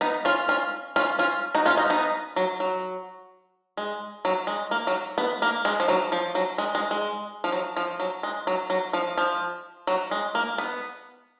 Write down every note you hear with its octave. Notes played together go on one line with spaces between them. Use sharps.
B3 D#4
C#4 F4
C#4 F4
C#4 F4
C#4 F4
D#4 F#4
C#4 F4
D#4 F#4
B3 D#4
F#3
F#3
G#3
F#3
G#3
A#3
F#3
B3
A#3
G#3
F3
F#3
F3
F#3
G#3
G#3
G#3
F3
F#3
F3
F#3
G#3
F#3
F#3
F3
F3
F#3
G#3
A#3
B3